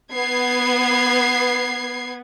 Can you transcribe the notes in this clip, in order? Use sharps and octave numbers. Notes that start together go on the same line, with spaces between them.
B3 G#6 C7